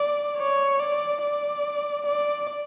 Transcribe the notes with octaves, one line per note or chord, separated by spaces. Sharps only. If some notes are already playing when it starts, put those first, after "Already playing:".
Already playing: D5
C#5
D5
D5
D5